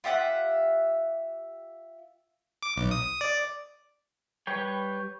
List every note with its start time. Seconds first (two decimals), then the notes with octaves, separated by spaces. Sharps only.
0.04 F4 G4 E5 F#5
2.63 D6
2.76 B1
2.91 D#6
3.21 D5
4.47 G3 B4 C#5 G5